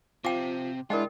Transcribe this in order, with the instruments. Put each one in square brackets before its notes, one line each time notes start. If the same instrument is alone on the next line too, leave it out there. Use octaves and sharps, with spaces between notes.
[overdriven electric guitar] C3 [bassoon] F3 [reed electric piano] F4 [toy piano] G5 D6
[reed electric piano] G#3 E4 [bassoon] D4 [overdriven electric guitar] F4 [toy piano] A#4 D#5 G5